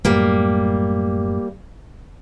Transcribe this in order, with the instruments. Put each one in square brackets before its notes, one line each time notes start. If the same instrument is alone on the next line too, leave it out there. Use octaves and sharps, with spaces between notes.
[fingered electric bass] F#2 A2 [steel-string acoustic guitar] G3 A#3